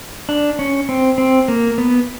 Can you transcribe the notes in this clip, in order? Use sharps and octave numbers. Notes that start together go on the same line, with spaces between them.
D4
C#4
C4
C4
A#3
B3